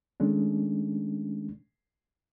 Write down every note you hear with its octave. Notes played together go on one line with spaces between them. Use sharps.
D#3 G#3 A3 C#4 D4